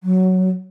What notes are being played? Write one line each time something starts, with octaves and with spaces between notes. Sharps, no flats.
F#3